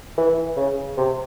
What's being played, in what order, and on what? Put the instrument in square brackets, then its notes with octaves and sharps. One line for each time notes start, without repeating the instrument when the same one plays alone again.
[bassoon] E3
C#3
C3